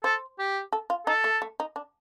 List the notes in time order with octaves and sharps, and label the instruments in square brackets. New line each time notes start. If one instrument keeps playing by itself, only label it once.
[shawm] A4 [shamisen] C5
[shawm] G4
[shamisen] A4
F4
[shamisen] D#4 [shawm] A4
[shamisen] A3
A3
D#4
D4